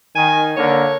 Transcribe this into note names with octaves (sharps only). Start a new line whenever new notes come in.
D#3 G#5
D3 A#3 A#4 C#5